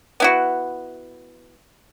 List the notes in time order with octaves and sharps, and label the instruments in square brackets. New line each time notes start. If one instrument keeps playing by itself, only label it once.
[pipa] B3 E4 F#4